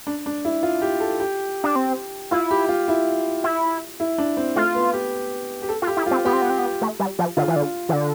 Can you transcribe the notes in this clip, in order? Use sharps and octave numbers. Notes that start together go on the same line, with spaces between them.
D4
D4
E4
F4
G4
A4
G4
D4
C4
E4 F4
G4
F4
E4
E4
E4
D4
C4
A3 F4
B3
G4
G4
A4
F4
G4
E4
F4
C4
B3 G4
C4
B3
C4
B3
A3
G3
F3
D3 F4
E3
D3
E3
D3